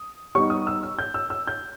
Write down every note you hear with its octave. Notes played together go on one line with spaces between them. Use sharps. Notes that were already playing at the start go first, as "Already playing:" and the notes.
Already playing: D#6
G3 B3 D#4 C#6
D#6
E6
E6
G6
E6
E6
G6